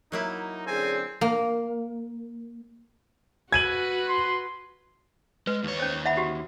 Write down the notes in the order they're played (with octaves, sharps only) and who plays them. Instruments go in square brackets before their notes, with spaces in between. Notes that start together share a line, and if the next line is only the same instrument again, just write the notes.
[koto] F#3 A#3 E4 [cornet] D#4
[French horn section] D3 C#4 G#4 [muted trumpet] C4 [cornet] G#5
[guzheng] A#3
[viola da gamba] F#4 B4 [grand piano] G#6 D#7 F#7
[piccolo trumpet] C6
[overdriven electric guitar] G#3 [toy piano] B4
[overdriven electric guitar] D#2 C#5
[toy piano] C#4 C5
E5 F#5 B5
F#4 G4